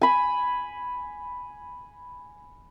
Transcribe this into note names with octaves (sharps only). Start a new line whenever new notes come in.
G#5 B5